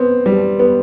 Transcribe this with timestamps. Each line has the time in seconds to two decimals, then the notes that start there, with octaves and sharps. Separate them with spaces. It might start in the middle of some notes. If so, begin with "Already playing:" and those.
Already playing: B3 C4
0.26 G3
0.59 B3